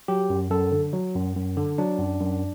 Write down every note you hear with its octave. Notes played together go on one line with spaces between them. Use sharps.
F#3 G4
F#2
F#2 A4
D3
F#3
F#2
F#2
D3
F#3 D4
F#2
F#2